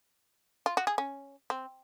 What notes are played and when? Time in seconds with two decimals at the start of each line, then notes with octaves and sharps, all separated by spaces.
0.66 F4
0.77 F#4
0.87 G#4
0.98 C#4
1.50 C4